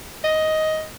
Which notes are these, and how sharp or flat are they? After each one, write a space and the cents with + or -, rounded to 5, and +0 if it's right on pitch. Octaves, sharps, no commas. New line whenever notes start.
D#5 +10